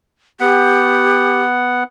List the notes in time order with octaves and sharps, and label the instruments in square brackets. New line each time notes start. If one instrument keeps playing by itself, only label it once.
[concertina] B3 F#5 [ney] G4